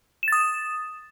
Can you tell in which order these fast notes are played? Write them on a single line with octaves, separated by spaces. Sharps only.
E7 A6 D#6